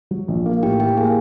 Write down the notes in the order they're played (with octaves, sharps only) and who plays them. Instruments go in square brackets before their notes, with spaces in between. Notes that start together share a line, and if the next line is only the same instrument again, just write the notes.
[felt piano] F#3
A#1
A#3
[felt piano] A2 [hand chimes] G4 G5
[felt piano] E3 [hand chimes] G4 G5
[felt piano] A#3 [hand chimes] G#4 G#5